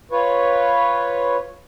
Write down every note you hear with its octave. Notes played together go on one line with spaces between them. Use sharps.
F4 B4 C#5